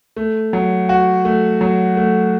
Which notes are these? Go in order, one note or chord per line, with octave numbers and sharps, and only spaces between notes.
A3
F#3
F#4
A3
F#3
A3